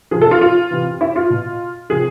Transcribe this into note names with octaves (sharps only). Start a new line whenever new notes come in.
C3 F3 G#4
A4
F4
F4
C3 E3
E4
F4
B2
C3 F3 G#4